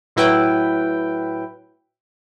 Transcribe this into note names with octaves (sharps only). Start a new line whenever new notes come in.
A2 F#3 E4 B4 G5